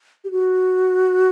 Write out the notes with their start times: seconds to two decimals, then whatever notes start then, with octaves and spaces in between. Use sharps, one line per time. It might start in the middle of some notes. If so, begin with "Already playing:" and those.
0.24 G4
0.31 F#4